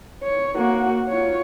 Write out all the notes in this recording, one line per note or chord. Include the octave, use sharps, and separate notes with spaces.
C#5
A#3 F#4
F4 C#5